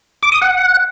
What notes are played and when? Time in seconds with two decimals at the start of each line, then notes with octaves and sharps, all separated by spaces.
0.23 D6
0.32 D#6
0.42 F#5